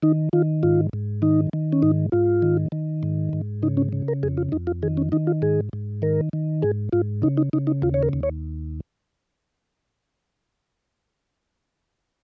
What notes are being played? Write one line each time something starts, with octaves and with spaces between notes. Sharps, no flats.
D#3 D#4
D#3 F4
G#2 F4
G#2
D#3 D#4
D#3
C#4
G#2 D#4
G#2 F4
D#3
D#3
G#2
G#2
C#3 D#4
C#4
C#3
A#4
F2 G#4
F4
F2 D#4
F4
D#3 G#4
C#4
D#3 D#4
F4
G#2 G#4
G#2
D#3 A#4
D#3
G#2 G#4
G#2 F4
C#3 D#4
D#4
C#3 D#4
D#4
D#2 F4
C#5
A#4
D#2
C#5